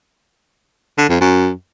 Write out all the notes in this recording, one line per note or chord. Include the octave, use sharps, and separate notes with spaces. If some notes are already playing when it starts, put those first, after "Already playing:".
D3
F2
F#2